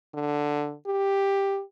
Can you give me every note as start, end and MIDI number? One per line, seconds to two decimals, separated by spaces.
0.14 0.74 50
0.87 1.62 67